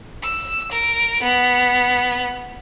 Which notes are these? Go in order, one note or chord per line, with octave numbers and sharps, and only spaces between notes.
E6
A#4
B3